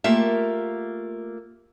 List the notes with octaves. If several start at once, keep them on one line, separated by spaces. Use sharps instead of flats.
A3 A#3 F4 G4 A#4 E5